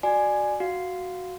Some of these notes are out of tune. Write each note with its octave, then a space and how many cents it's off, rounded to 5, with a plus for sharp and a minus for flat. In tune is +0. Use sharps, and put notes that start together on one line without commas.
F#4 +0 D5 +25 G#5 +0
F#4 +0 F5 -5